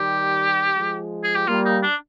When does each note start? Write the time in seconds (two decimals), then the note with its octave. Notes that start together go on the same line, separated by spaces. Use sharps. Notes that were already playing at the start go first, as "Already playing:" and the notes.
Already playing: D#3 G3 G4
0.77 F3 G#3
1.24 G#4
1.35 G4
1.47 G3 A#3 F4
1.65 D#4
1.83 D4